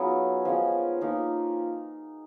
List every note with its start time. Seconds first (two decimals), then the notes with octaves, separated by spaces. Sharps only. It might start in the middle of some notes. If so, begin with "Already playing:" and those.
Already playing: F#3 B3 C#4 D#4 F4 G#4 C#5
0.45 F3 G#3 C#4
1.01 F3 A#3 D#4